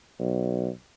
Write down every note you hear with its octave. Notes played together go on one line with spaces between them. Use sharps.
B1